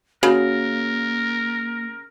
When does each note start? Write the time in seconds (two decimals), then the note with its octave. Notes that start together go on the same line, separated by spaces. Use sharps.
0.23 C#3 A#3 F#4 A#4